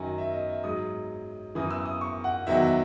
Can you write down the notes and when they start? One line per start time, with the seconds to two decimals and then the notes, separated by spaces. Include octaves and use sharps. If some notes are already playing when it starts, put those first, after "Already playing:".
Already playing: F#2 D#3 F#3 G#5
0.18 E5
0.34 D#5
0.49 E5
0.64 G#2 F#3 D#6
1.55 F#2 E3 D#6
1.71 E6
1.86 D#6
2.01 C#6
2.24 F#5
2.47 E2 D#3 F#3 E5
2.55 F#5
2.62 E5